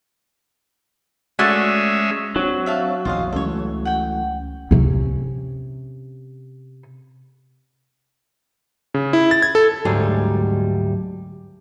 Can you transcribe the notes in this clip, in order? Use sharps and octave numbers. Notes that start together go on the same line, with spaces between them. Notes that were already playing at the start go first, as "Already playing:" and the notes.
G#3 A3 C#4 F#4 D5 E5
F#3 C4 D4
E5 F5 A5
A#1 E2 C#3 F4 D#5 F5
C#2 E3 A3 C#4 A4 C#5
F#5 G5
C3 C#4
C#3
E4
A6
G#6
A4
D2 G#2 F#3 G3 A3 G#4